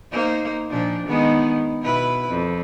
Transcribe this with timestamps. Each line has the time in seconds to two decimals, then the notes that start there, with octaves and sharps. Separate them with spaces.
0.12 A#3 D#4 C5
0.70 A#2 F3 D4
1.07 D#3 G#3 B3
1.81 B2 E4 B4
2.29 F2